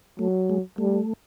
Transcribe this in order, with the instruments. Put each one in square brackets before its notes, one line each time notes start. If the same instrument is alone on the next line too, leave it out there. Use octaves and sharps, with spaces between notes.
[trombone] F#3 [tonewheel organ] A3
[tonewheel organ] G#3
[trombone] G3 [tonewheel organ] A3